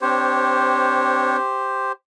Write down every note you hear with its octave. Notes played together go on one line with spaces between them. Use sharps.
C4 D4 G4 C5 C#5